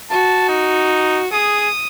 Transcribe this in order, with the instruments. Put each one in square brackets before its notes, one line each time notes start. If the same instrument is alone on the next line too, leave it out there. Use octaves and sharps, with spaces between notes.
[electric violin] F#4 [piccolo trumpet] A5
[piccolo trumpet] D#4
[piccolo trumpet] G#4 [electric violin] D#6